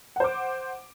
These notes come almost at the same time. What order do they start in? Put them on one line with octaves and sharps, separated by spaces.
F#5 C5 D6